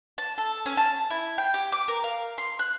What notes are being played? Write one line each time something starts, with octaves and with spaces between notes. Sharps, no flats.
A5
A4
C#4
A5
E4
G5
G4
D6
A#4
F5
C6
F#6